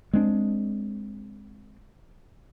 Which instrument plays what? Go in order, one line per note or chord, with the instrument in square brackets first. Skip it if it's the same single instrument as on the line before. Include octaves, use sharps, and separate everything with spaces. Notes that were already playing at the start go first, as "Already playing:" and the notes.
[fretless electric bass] G#3 C4 D4